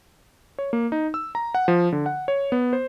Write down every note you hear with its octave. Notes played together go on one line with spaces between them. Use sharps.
C#5
A#3
D#4
E6
A#5
F#5
F3
D3
F#5
C#5
B3
C5